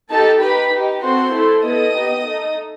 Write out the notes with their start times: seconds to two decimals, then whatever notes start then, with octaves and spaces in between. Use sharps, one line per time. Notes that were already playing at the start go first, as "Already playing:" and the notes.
0.11 D#4 G4 A4 A5
0.41 D#4 G4 B4 B5
0.72 D#4 G4
1.02 C4 F#4 A4 C5 C6
1.33 A3 E4 A4
1.64 B3 E4 A4 D#5 D#6
1.95 B3 D#4 G4
2.26 A3 D#4 A4